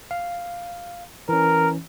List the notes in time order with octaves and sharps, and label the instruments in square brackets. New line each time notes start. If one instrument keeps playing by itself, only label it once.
[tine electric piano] F5
[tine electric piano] E3 C#4 [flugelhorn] A#4